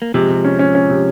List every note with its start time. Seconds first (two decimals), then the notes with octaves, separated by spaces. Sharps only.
0.02 A#3
0.14 C3 F3 G#3
0.30 C3
0.44 C#4
0.59 C#4
0.75 C#4
0.90 C3